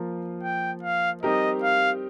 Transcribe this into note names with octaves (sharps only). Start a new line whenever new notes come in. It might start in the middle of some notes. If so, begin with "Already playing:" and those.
Already playing: F3 A#3 F4 A#4
G5
F5
G3 C4 D#4 G4 A#4 D#5
F5